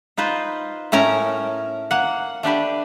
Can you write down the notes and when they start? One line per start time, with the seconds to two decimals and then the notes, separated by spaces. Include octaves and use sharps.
0.17 D#4 F4 B4 C5
0.92 A2 A3 C#4 A#4 G#5 A#5
1.91 A#3 F#5
2.43 A3 D4 G4 B4